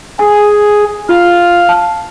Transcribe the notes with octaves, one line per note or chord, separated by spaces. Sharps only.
G#4 G#5
F4 F5
A5